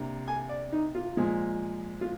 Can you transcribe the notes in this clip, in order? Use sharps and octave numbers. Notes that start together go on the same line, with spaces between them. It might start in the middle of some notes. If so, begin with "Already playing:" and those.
Already playing: C3 A#3 D4
G#5
D5
D#4
F4
A#2 F3 G#3
F4